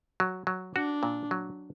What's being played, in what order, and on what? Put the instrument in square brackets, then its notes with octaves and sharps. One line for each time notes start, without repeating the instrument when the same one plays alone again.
[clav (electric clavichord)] F#3
F#3
[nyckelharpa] D4 [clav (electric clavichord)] F#4
[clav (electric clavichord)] A#2
F#3